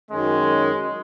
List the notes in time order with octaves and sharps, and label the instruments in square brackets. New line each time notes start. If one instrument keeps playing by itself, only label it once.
[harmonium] F#2 D#3 C#4 [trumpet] G#3